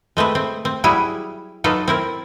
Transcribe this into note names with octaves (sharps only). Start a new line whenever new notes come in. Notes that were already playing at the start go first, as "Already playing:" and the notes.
G#3 A3 C4 B4
C4
C4
F#3 G3 E4 F#4 G#4
F#3 D#4 F4 A4 B4
C4 E4 A#4